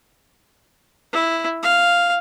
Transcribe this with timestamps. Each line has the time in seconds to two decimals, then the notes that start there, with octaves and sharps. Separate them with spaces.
1.13 E4
1.63 F5